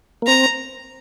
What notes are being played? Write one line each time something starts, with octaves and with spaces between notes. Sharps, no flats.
A#3
C4 A#5